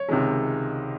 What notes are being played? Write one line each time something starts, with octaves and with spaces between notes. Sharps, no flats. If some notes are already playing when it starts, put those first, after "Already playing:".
Already playing: C#5
C#2 C3 D#3 G#3